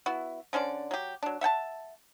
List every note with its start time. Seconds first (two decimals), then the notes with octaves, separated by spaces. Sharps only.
0.06 B3 E4 F#4
0.53 D3 C#4 C5 D5
0.91 F#3 G4
1.23 F#3 D4
1.41 E5 F#5 G5 A5